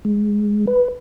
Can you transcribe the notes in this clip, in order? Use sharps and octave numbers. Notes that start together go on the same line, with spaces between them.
G#3
B4